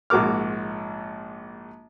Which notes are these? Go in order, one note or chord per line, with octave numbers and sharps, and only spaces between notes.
A#1 G#2 F#4 A#4 D6 F6